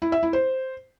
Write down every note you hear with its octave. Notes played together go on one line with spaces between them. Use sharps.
E4
E5
E4
C5